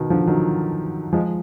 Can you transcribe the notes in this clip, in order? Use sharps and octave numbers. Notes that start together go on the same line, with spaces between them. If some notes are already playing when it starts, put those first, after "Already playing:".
Already playing: B2 D#3
D3 F3
D#3 F#3
F3 G#3